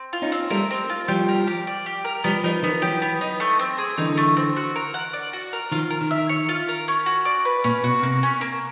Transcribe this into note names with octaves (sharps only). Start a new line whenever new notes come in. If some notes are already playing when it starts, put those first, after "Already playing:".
Already playing: C4
F4
C#4 D#4
C4
G3 A3 A#4
C4
F4
F3 G3 G4
A#4
G4
D5
G4
A#4
F3 G3 B3
F3 G3 D#4
D#3 F3 B3
E3 F#3 G4
B3
D#4
A3
C4
G#4
D3 E3 D#4
A3
C4
F#4
A#4
F#5
D5
F#4
A#4
D#3 F3 F4
A#4
D#3
E5
C#5
F4
A#4
C#4
F#4
D5
B4
A#2 C#4
B2 F#4
C3 A#3
C#4
A#3